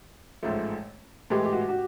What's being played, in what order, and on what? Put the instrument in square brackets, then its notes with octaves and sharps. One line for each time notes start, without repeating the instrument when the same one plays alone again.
[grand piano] A1 G#2 F3 A3
[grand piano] A2 E3 G#3 [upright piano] G4
[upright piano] G4
F#4
F#4